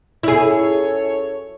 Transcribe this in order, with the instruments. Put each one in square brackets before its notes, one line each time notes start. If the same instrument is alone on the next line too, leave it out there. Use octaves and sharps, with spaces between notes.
[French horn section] F#2 A4 C#5 [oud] E4 G#4